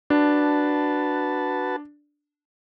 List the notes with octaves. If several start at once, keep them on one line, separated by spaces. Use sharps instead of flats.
D4 F#4 B4 A5